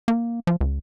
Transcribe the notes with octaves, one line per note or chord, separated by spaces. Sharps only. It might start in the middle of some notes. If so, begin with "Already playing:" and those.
A#3
F3
C#2